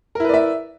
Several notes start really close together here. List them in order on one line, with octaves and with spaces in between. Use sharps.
A#4 E4 B4 D5 E5